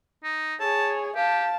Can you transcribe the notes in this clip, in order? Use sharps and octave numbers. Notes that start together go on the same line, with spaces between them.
D#4
G#4 C#5 A5
G4 F5 A5